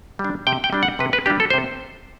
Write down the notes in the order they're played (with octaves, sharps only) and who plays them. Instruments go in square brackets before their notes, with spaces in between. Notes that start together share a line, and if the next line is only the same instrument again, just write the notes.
[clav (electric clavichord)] G3
D4
C3 G5
G5
G3 D4
F#5
C3 B4
B4
G3 D4 G4
A4
C5
C3